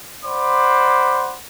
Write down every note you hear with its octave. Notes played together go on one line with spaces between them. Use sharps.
C5 D5 F#5 B5 C6 D6